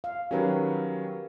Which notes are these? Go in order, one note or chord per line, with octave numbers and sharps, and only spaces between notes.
F5
D#3 F#3 C#4 G4 A#4 B4